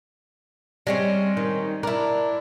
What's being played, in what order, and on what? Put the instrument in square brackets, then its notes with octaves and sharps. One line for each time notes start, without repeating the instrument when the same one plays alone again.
[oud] G3 [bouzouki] G#3 C4 C#4
[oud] D#3
[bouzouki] D4 E4 [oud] A#4